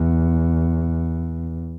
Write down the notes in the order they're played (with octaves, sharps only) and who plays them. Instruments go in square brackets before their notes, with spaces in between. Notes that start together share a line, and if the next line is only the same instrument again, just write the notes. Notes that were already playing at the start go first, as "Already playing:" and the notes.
Already playing: [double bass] E2